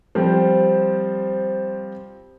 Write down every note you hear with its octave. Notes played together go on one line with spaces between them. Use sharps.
F3 G3 C4